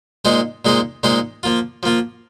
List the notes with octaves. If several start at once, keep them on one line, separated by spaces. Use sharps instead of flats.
A#2 G#3 D#4 G#4 C5
A#2 G#3 D#4 G#4 C5
A#2 G#3 D#4 G#4 C5
F3 A#3 F4
F3 A#3 F4